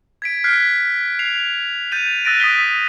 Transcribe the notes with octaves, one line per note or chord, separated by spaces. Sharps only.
G#6 B6 D7
F6 F#6 G#6 B6 C7
C7 F7
G6 A6 D#7 F7
E6 F#6 A6 A#6 D7 D#7
D#6 F#6 B6 G7